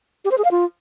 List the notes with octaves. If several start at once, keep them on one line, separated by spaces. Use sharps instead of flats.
G4
C5
G#4
F5
F4